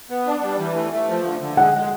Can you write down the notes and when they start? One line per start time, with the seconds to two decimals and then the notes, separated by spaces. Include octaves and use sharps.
0.10 B3
0.27 D4
0.43 G3
0.59 E3
0.76 A3
0.92 A3
1.09 F3
1.25 D3
1.41 D3
1.57 G#3 F#5
1.74 G#3